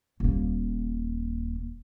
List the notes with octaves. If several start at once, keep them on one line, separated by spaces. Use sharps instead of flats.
D#1 A#3